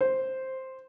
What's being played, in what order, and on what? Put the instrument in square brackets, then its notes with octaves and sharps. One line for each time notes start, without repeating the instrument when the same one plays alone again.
[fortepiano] C5